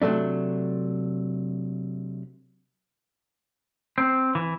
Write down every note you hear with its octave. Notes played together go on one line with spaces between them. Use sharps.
C3 F#3 A3 D4
C4
E3